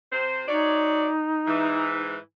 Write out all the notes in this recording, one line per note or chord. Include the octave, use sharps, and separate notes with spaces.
C3 C5
F#3 D#4 C#5 D5
G#2 E3